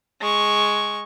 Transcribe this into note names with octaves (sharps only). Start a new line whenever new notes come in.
G#3 C#6